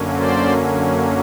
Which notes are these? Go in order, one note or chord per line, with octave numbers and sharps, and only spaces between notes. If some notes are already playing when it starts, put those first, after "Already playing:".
Already playing: F#2 D3 F#3 A#3 C#4
C5 D5